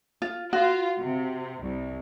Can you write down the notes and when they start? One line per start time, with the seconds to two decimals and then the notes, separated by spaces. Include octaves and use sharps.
0.22 F4
0.53 F4 F#4
1.00 C3
1.63 C2